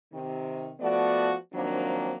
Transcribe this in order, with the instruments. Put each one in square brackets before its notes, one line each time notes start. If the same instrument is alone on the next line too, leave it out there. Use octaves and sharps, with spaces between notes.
[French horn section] C3 D#3
F3 A3 B3 F#4 D5
D#3 F3 F#3 A#3 C4 D4